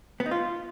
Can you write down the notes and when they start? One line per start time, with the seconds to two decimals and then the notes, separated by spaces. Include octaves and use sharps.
0.20 B3
0.26 D#4
0.31 F4